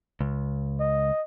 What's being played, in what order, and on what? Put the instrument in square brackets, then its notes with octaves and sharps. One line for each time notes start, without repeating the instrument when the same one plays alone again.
[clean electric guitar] C#2
[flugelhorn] D#5